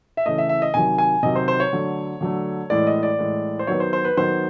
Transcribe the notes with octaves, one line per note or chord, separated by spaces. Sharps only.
E5
C#3 E3 A3 D#5
E5
E5
D#5
C3 D#3 F#3 G#5
G#5
C3 D#3 F#3 D#5
C5
C5
C#5
D3 F#3 A3
D3 F#3 A3
A2 E3 G#3 D5
D#5
D5
A2 E3 G#3
C5
D#3 F#3 B3 C#5
C5
C5
B4
D#3 F#3 B3 C5